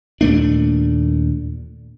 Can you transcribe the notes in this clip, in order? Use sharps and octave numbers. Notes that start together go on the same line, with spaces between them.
D#2 A#2 A3 D4